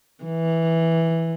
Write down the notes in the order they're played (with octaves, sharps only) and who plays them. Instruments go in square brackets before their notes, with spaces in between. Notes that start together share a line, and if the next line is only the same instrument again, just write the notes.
[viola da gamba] E3